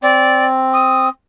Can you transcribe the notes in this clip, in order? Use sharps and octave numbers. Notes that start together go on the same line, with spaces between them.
C4 D5
D#6